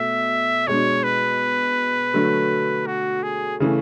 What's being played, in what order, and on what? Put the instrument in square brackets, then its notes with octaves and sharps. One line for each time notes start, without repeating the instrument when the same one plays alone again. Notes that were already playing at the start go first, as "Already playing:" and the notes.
Already playing: [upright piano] B2 A3 [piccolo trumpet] E5
[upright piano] B2 G#3 D4 [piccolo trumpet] C#5
[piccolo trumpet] B4
[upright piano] D3 F#3 A3
[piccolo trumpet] F#4
G#4
[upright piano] C#3 E3 A3